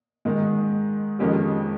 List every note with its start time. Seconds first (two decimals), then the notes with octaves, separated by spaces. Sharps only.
0.25 G#2 D#3 G#3
1.19 F2 D#3 G#3 C#4 G4